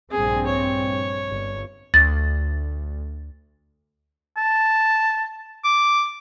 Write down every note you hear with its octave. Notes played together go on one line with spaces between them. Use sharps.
A#1 G2 C4 G#4
C#5
G1
D2 A6
A5
D6